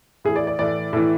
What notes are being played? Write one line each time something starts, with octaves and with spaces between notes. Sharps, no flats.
A2 E3 G#4
D5
D5
A2 E3 D5
A2 E3